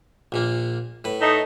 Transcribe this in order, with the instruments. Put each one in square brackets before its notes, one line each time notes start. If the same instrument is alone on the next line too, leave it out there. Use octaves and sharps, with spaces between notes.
[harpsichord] A#1 A#2 A#3
A2 B4
[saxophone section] A3 D#4